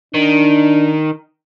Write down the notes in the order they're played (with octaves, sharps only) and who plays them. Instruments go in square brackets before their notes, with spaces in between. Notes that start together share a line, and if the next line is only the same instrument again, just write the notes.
[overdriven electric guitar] D#3 [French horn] D4